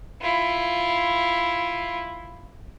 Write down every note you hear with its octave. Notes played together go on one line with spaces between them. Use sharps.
E4 F4